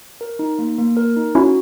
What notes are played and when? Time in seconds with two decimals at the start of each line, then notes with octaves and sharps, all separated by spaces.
0.21 A#4
0.39 D#4
0.59 A#3
0.78 A#3
0.97 A#4
1.16 D#4
1.35 C#4 E4 F#4